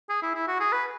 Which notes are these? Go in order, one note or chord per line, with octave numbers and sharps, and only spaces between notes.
G#4
E4
E4
F#4
G#4
B4